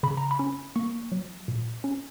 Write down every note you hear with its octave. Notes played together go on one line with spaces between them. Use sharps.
C#3 B5
A#5
B5
C#4
A#3 C#6
F#3
A#2
C#4